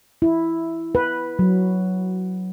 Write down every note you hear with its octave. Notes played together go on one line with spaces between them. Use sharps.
E4
B4
F#3